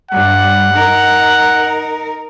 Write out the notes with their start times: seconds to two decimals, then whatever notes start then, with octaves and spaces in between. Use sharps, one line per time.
0.11 G2 G3 F#5
0.72 D#4 A#4